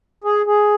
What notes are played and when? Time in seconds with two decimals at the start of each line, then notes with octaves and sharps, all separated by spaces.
0.24 G#4
0.46 G#4